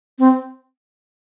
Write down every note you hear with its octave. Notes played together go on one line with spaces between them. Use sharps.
C4